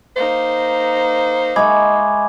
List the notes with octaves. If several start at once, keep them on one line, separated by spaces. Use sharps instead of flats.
A#3 D#4 C5
G#3 E5 B5 C#6 D6 G#6